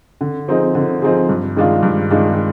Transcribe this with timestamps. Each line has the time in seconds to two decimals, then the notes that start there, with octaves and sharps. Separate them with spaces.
0.21 D3
0.48 F3 C4 D#4 G#4
0.75 D3
1.02 F3 C4 D#4 G#4
1.29 G2
1.56 D#3 G#3 D4 F4
1.83 G2
2.11 D#3 G#3 D4 F4